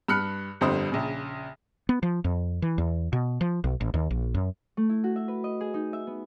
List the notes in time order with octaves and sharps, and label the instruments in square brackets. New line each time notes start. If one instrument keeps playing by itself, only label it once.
[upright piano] G2 B5 F6 F#6 C#7
G1 F2 D3 G3 C5 D#6
A#1 C#3
[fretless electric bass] B3
F3
F2
E3
E2
B2
F3
B1
A1
D#2
A#1
F#2
[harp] A3
E4
F#4
E5
B4
D#5
G#4
D#4
E5
B3